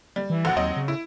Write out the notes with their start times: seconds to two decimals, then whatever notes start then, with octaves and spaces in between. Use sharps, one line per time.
0.16 G3
0.30 E3
0.45 A#1 F#4 F#5
0.57 D#2 F#3 C4 D#5
0.77 C#3
0.88 E4